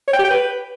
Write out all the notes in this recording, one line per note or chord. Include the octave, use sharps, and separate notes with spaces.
C#5
G5
G4
G5
B4